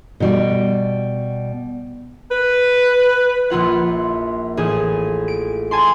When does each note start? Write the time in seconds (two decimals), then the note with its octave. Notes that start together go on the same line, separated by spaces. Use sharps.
0.20 B2 G3
2.31 B4
3.50 A#1 E4 F4 F#5
4.57 A1 G#4
5.28 D7
5.71 G#5 A5 C6